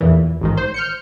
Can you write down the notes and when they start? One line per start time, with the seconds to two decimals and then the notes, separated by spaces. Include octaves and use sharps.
0.01 E2 A#2 E3
0.41 A1 G#2 D#3
0.57 C5
0.74 F6 G6 C#7